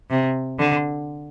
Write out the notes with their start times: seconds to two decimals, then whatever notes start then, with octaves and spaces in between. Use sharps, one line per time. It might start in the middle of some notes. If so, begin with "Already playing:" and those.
0.10 C3
0.59 D3